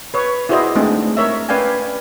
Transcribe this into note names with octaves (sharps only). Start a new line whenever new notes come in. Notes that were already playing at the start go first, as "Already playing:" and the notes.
B4 C#5
E4 F#4 G#4 C5 D5 D#5
G#3 A3 C4 D4 D#4 G#4
A#4 C#5 E5
C#4 B4 D5 F5 G5 G#5